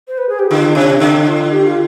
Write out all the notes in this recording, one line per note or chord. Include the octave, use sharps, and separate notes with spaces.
C5
B4
G#4
G4
D3 F4
C3 D4
D3 D#4
F4
G4
F4